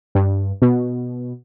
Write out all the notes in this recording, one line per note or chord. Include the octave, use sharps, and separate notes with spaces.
G2
B2